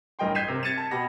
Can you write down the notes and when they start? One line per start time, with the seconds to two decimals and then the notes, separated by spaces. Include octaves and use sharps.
0.19 A1 G2 A#4 D#5 G5 C6
0.35 G6 G#6 B6 C7 D#7 E7
0.48 C3 A#4 C5
0.63 G#6 A6 C#7 D#7 E7
0.77 A5
0.91 B2 G4 B5 A#6